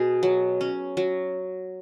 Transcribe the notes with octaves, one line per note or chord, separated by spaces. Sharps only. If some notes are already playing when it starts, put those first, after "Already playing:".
Already playing: B2 G#4
F#3
C#4
F#3